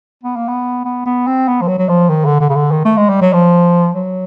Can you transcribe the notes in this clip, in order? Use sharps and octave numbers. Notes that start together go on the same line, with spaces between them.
B3
A#3
B3
B3
B3
C4
B3
F3
F#3
F#3
F3
D#3
D3
D3
C#3
D3
D#3
A3
G#3
G3
F#3
F3
F#3